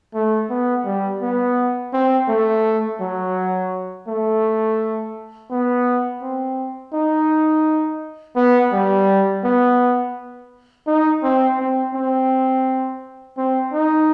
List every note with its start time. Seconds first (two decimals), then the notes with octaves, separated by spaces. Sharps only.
0.14 A3
0.50 B3
0.85 G3
1.22 B3
1.93 C4
2.29 A3
3.01 F#3
4.08 A3
5.51 B3
6.22 C4
6.94 D#4
8.36 B3
8.73 G3
9.44 B3
10.87 D#4
11.23 C4
11.59 C4
11.94 C4
13.37 C4
13.73 D#4